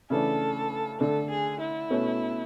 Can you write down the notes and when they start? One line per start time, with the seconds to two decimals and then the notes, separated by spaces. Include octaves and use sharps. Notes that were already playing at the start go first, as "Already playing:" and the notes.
0.10 C#3 E3 A3 D4 A4
1.00 D3 A3 D4 A4
1.30 G#4
1.60 E4
1.90 B2 A3 C#4